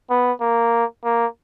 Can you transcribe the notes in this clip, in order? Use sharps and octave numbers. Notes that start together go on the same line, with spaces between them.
B3
A#3
A#3